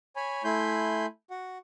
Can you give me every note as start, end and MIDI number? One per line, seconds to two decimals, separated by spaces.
0.16 0.44 73
0.16 0.44 80
0.16 0.44 83
0.44 1.06 57
0.44 1.06 64
0.44 1.06 80
0.44 1.06 83
0.44 1.06 84
0.44 1.06 91
1.31 1.58 66
1.31 1.58 78